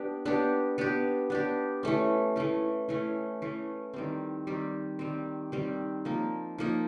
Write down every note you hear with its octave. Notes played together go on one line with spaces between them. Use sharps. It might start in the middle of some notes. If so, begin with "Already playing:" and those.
Already playing: B3 D4 G4
B3 D4 G4
B3 D4 G4
B3 D4 G4
E3 A3 C#4
E3 A3 C#4
E3 A3 C#4
E3 A3 C#4
D#3 G3 C4
D#3 G3 C4
D#3 G3 C4
D#3 G3 C4
F3 A#3 D#4
F3 A#3 D#4